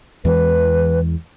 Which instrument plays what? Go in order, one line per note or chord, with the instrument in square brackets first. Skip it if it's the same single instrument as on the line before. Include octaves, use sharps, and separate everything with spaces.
[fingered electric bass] E2 E3 G#3 [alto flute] B4